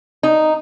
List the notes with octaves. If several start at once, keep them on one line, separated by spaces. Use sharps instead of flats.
D#4